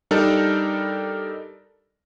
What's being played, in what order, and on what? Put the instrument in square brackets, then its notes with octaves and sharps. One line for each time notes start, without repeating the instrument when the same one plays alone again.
[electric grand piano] G3 D4 D#4 A4 A#4 D5